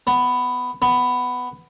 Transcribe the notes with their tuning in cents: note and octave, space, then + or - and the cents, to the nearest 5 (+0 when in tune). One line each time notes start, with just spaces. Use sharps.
B3 +10
B3 +10